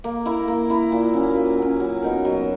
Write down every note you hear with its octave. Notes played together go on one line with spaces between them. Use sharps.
A#3
E4 A#4
A#3
E4 A#4
A#2
F#3 C#4
A#2
F#3 C#4
F#3
B3 D#4 A#4
F#3